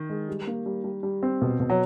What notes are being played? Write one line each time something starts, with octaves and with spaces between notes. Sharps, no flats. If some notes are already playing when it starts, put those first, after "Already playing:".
Already playing: D#3
G#3
G3
A#3
G3
G3
G3
C4
B2
B2
F#3